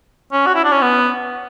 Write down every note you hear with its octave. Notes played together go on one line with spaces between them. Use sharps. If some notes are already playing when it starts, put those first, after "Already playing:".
C#4
F#4
E4
D4
C#4
B3